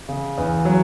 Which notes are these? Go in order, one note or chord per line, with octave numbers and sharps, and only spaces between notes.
C#3
E2
F#3